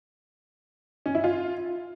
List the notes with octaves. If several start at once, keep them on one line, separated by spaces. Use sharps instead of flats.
C#4
E4
F4